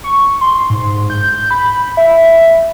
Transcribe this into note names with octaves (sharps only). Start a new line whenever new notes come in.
C#6
C6
G#2
G6
B5
E5